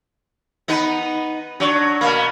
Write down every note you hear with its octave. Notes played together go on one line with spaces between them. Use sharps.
B3 D#4 B4
F#3 D4 D5 C#6
B2 A#3 B5